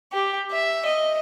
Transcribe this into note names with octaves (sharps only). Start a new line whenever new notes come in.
G4
E5
D#5